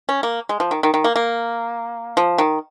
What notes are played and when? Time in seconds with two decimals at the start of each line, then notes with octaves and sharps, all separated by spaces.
0.09 C#4
0.23 A#3
0.49 G#3
0.60 F3
0.71 D#3
0.83 D#3
0.94 D#3
1.04 A#3
1.16 A#3
2.17 F3
2.38 D#3